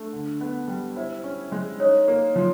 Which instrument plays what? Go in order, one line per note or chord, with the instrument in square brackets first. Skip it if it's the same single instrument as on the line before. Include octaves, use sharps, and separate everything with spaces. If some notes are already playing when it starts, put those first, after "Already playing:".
Already playing: [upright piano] A3 D4
D3
B3
G3
[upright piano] E4 [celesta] C5
[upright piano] C#4
G#3
[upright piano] D#4 [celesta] C#5
[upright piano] A#3
F3